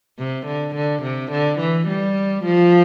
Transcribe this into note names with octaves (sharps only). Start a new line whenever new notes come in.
C3
D3
D3
C3
D3
E3
G3
F3